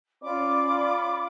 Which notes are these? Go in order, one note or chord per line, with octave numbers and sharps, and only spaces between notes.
C#4 F4 D5 B5 D6